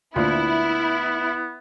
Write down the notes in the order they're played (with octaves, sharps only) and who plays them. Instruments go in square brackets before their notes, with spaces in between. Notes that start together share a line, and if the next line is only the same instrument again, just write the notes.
[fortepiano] D2 A#2 [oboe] B3 [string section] E4